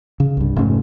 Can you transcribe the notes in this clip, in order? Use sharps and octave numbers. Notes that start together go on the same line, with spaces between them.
C#3
C2 G2
F1 G#2 A3 C#4